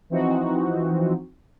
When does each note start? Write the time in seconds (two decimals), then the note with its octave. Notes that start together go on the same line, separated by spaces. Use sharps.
0.10 E3 F3 C4 D#4 F#4